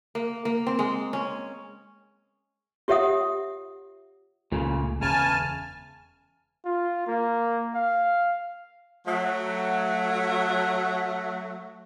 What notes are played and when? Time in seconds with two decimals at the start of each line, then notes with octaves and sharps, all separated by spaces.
0.15 A#3
0.45 A#3
0.67 C4
0.79 G#3
1.13 C#4
2.88 F4 G4 C#5 E5 F#5 D#6
4.52 C#2 A#2 C#3 A3
5.01 E1 C#3 G#5 A5 F6
6.65 F4
7.07 A#3
7.75 F5
9.06 F#3 A3